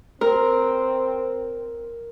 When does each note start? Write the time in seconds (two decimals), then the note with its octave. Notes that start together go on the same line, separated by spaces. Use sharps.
0.21 C4 A#4